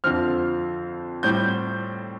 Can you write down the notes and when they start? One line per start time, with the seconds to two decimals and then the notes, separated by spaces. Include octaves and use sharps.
0.04 F2 D3 F3 C4 F6
1.23 A2 G3 C4 G6